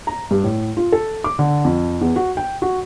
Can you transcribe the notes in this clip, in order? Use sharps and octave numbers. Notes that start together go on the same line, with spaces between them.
A#5
G2
A2
F4
A4
D6
D3
F2
E2
F#4
G5
F#4